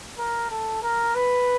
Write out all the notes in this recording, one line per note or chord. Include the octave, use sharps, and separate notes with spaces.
A#4
A4
A#4
B4